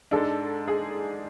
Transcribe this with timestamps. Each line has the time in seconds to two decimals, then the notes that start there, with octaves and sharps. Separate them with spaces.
0.11 G#2 G#3 D4 A4
0.68 G#4